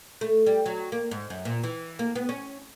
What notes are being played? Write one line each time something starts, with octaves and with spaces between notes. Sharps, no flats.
A3
G3
F#3
A#3
G#2
F#2
A#2
E3
A#3
B3
C#4